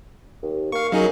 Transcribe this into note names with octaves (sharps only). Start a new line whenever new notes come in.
D#2
A#3 F5 C#6
F#2 F#3 D#4 G#4